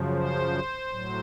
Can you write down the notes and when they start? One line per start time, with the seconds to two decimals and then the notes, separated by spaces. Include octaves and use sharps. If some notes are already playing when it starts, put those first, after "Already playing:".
Already playing: F#2 C#3 F3
0.15 C5
0.89 A2 F#3